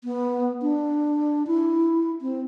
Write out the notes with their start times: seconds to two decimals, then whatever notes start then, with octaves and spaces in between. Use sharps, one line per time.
0.04 B3
0.62 D4
1.47 E4
2.21 C4